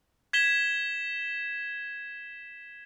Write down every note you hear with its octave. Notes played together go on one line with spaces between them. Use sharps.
G#6 B6 E7 G7